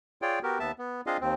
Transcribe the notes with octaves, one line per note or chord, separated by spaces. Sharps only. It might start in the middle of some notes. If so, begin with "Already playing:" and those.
F4 G#4 C#5 D5 G5
B3 F#4 G4 A#4
D#2 B3 E5 A5
B3
C4 D4 F4 G#4 D#5 F5
D#2 C4